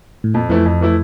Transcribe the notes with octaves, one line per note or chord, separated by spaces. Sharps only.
A2
F2 A#2
F2 E3 F3 A3 E4
F2
E3 A3 E4